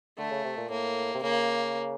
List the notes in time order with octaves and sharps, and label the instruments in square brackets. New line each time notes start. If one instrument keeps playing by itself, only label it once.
[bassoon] D3 [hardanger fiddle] A3
[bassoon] C#3
C3
A#2
[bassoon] A2 [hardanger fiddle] A#3
[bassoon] C3
[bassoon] C#3 [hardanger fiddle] A#3